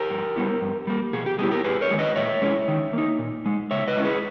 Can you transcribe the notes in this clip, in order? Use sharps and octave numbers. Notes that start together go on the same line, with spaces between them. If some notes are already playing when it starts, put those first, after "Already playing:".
Already playing: G4 A#4
G2
G3 B3 E4
G2
G3 A#3
B2 G#4
G4
G3 B3 E4 G#4
G4 A#4
G#2 G#4 B4
A#4 C#5
D#3 G#3
B4 D#5
A#2 C#5 E5
G#3 C#4 E4
D#3
A#3 D#4
A#2
G#3 D#4
C#3 C#5 E5
B4 D#5
G#3 C#4 E4
G#4 B4